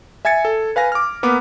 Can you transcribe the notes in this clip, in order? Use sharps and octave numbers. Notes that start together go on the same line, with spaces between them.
E5 G#5 G#6 A6 C#7
A4
B4 F5 G#5 A#6
D6 F6
A#3 B3 B4 D6